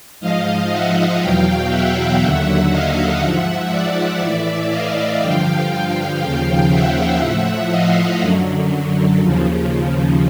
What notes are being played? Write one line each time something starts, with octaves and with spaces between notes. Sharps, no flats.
G#2 F3 D#5 F5
E5 F#5
E2 B2 F#3 F5 G5
E5 F#5
D#2 D3 F#3
D#5 F5
G#2 F3 E5 F#5
D5 E5
A2 E3 D5 E5
D#5 F5
G2 D3 F3 F5 G5
F5 G5
D#2 C#3 F3
E5 F#5
A2 F3
D#5 F5
F#2 D3 F#3
D#2 C#3 F3